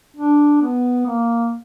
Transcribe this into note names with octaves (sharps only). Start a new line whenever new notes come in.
D4
B3
A#3